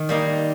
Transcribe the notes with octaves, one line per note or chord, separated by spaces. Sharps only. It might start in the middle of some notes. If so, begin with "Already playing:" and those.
Already playing: D#3
G3 A#3 D#4